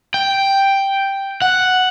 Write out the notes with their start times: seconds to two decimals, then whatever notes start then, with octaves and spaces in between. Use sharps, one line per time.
0.14 G5
1.42 F#5